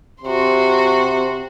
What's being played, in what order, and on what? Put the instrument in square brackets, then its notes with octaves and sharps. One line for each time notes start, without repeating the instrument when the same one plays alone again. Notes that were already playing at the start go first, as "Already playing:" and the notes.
[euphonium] C3 [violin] F#4 C6